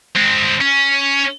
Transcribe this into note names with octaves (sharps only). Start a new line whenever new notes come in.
G#3 C4
C#4